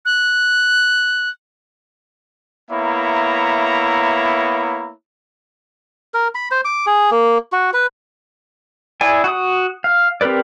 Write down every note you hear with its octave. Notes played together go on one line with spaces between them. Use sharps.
F#6
A#3 B3 E4 C#5 E5 A#5
A#4
B5
C5
D6
G#4
A#3
F#4
B4
E4 G#4 D5 G#5
F#4 D#6
F5
C4 G4 A#4 B4 D5